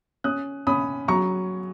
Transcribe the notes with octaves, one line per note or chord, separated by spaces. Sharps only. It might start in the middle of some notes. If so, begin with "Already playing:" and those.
C#4 D#6 F#6
C#4 B5 D#6
F#3 A#5 C#6